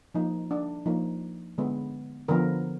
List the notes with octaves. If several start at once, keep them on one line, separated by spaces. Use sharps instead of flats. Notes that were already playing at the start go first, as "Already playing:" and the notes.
F3 A#3 D#4
D4
F3 A#3 D#4
D3 G#3 B3
D3 F3 B3 A#4